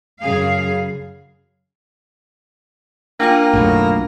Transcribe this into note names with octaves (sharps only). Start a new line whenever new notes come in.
F#2 C#3 G#4 F5
A#3 D4 F4 G5 G#5 A#5 D6
B1 F#2 A2 B3 F#4 A4